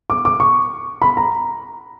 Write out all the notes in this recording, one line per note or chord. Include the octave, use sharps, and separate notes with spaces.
D6
D6
C#6
B5
A#5